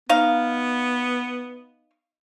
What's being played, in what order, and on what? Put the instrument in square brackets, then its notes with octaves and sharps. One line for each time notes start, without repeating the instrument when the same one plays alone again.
[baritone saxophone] B3 [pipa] D#4 F5